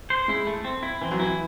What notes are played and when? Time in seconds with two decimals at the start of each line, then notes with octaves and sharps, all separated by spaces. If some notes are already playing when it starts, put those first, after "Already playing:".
0.10 C5
0.28 G#3 E4
0.47 A3
0.65 C4
0.83 E4
1.01 E3 C4
1.11 F#3
1.20 E3 E4